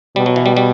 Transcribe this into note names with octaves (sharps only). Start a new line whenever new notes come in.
B2 G3
F#3
E3
G3
G3